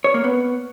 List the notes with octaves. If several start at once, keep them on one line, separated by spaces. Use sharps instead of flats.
C#5
A#3
B3